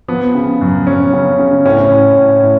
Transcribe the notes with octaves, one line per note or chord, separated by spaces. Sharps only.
F3 B3
C#3
F#2
F#2 C#4
C#3
C#3
A2 C#4
A2
A2
A2